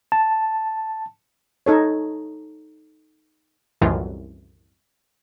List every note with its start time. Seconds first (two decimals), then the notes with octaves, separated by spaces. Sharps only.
0.12 A5
1.66 D#4 A4 C#5
3.81 C2 F#2 A2 D#3 E3 F4